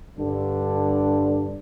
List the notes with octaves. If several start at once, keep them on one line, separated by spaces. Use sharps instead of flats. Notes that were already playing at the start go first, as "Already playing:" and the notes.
G2 D3 D4